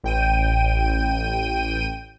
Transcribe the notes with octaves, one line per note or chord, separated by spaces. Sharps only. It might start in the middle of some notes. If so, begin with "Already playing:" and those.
A1 G5 D#7